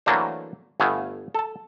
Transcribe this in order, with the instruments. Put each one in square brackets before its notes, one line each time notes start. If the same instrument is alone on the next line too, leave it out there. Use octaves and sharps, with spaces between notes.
[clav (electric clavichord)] E3 F#3 A3 A#3 D4 C5
G1 A3 B3 F5 G#5
A4 A5